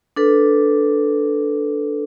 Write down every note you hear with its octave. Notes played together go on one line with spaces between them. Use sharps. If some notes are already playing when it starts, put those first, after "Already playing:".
D4 A4 B4